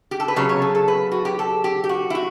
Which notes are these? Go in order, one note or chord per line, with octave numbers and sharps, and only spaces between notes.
G4
A4
B4
C#3 F#3 B3 C#5
C#5
A4
A4
B4
F#4
G4
A4
G4
G4
F#4
E4
F#4